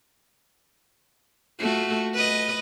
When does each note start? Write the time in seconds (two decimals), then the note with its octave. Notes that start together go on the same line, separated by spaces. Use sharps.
1.59 A3 F4 F#4
2.14 B4 D#5